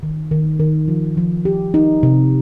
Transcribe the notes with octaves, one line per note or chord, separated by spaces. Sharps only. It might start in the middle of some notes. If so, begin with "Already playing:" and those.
D#3
D#3
D#3
F3
F3
G4
D#4
C3